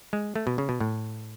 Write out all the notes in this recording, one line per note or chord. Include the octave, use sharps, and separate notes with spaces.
G#3
A3
B2
C#3
B2
A2